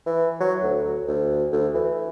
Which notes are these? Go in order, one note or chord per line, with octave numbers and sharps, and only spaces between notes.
E3
F#3
D2
D2
D2
E3